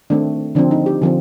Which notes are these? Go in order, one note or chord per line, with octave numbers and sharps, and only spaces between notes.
D#3 A3 C4 D4
D3 F3 C4 D4
D#4
G4
D3 F3 C4